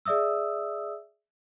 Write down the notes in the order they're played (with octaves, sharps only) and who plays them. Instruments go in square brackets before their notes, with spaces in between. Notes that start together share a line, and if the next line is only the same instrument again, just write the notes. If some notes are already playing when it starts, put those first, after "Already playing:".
[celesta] G#4 D5 E5 D#6 E6